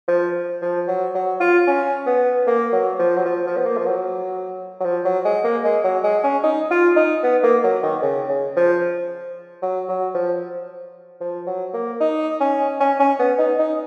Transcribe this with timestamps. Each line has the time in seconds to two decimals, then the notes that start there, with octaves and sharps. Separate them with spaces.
0.08 F3
0.62 F3
0.88 F#3
1.15 F#3
1.40 F4
1.67 C#4
2.06 B3
2.47 A#3
2.73 F#3
2.99 F3
3.17 F#3
3.25 F3
3.47 F3
3.57 B3
3.66 A#3
3.77 F3
3.86 F#3
4.81 F#3
4.85 F3
5.05 F#3
5.25 G#3
5.44 A#3
5.64 G#3
5.84 F#3
6.04 G#3
6.24 C#4
6.44 D#4
6.71 F4
6.96 D#4
7.23 B3
7.44 A#3
7.64 F#3
7.83 D#3
8.03 C#3
8.29 C#3
8.56 F3
9.62 F#3
9.88 F#3
10.15 F3
11.21 F3
11.47 F#3
11.74 A#3
12.00 D#4
12.41 C#4
12.80 C#4
13.00 C#4
13.19 B3
13.39 D#4
13.59 D#4